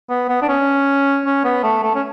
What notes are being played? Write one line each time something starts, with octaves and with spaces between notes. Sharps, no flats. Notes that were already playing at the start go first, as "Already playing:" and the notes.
B3
B3
D4
C#4
C#4
B3
A3
A3
C#4